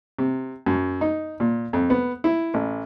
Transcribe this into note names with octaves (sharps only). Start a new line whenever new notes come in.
C3
F#2
D#4
A#2
F2
B3
E4
A1